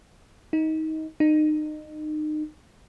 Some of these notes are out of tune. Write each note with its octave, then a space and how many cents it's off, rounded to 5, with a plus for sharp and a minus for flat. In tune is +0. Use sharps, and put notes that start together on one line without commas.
D#4 +20
D#4 -30